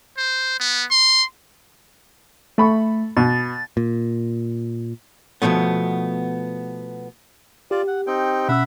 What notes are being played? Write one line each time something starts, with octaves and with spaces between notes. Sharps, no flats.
C5
B3
C6
A3 A4 B5 C#6
B2 A6
A#2
B2 E3 F3 A3 B3
F4 G4 D5
F#5
C4 D#4 G5
B2 C#4 E5 F#5 B5 E6